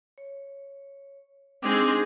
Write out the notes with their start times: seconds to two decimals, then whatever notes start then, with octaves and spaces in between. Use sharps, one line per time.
0.18 C#5
1.63 G#3 C4 D4 D#4 G#4 D6